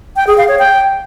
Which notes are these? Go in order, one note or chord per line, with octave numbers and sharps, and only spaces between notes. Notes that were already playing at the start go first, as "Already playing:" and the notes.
G5
G#4
F5
C#5
G5